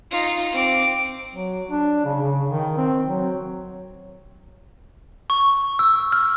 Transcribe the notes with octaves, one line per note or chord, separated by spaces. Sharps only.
D#4 F4
C4 D6
F#3
D4
C#3
C#3
D#3
C4
F#3
C#6
E6
F6